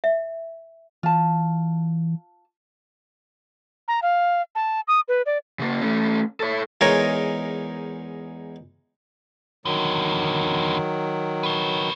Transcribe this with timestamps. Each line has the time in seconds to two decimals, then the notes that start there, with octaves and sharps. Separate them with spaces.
0.04 E5
1.03 E3 F4 A5
3.88 A#5
4.02 F5
4.55 A5
4.88 D#6
5.08 B4
5.26 D5
5.59 C#3 A#3
5.81 A3 C#4
6.40 A4 C#5
6.81 E2 G#3 D#4 A#4 C#5
9.65 E2 D3 D#3 F#3
11.43 B4 C#5